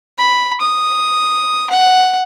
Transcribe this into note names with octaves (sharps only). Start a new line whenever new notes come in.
B5
D#6
F#5